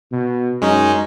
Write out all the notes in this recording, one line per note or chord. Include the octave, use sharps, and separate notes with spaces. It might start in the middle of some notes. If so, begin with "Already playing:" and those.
B2
F#2 G#3 C#4 D#4